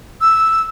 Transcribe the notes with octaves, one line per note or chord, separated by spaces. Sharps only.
E6